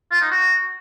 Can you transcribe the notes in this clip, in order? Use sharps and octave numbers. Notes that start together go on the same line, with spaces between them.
F4
D#4
F#4